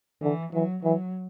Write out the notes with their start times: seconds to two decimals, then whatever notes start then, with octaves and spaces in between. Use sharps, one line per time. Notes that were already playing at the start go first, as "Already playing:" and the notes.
0.22 D3 E3
0.53 E3 F#3
0.84 E3 F#3